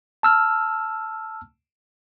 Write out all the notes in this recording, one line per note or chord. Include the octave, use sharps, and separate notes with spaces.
A5 E6 F6